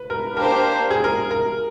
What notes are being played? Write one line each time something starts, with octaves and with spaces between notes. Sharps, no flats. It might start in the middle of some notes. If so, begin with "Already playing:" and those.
Already playing: B4
A#4
A#3 D4 G4 A#4 C5
G#4
A#4
A#4